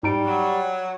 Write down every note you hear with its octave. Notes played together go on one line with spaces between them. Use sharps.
G#2 G3 D#4 D7
F#3